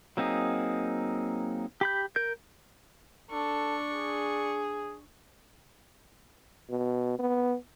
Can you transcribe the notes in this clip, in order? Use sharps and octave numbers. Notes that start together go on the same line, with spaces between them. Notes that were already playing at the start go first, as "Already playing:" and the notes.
F#3 A#3 C4 D#4 G#4
G4 B5 G6
A#4 G6
D4 A4 C#6
G#4
B2
B3